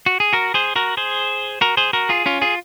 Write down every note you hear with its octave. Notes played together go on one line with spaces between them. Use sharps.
F#4
G#4
F#4 A#4
G#4 C5
F#4 A#4
G#4 C5
F#4 A#4
G#4 C5
F#4 A#4
F4 G#4
C#4 F4
F4 G#4